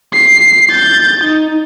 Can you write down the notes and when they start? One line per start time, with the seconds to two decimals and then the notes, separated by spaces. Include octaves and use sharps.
0.13 C7
0.71 G6 A6
1.24 D#4